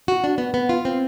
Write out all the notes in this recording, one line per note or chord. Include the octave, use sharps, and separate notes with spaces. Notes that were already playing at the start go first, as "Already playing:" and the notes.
F#4
D4
B3
B3
F4
C4